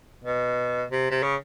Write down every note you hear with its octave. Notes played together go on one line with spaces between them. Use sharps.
B2
C3
C3
C#3